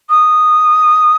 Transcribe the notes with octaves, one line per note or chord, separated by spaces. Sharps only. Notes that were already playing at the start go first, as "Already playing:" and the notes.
D#6